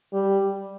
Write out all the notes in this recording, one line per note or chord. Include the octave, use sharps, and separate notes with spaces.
G3